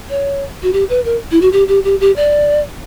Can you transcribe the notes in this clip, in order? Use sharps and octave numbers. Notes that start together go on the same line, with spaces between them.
C#5
F#4
G4
B4
A#4
E4
F#4
G4
G4
G4
G4
D5